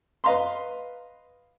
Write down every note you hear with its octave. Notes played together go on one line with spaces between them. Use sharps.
B4 D#5 F5 A#5 C6